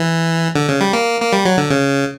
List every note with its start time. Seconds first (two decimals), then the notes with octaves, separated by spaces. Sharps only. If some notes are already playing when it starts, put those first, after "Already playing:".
Already playing: E3
0.55 D3
0.69 C#3
0.81 G3
0.93 A#3
1.21 A#3
1.33 G3
1.45 F#3
1.57 D3
1.70 C#3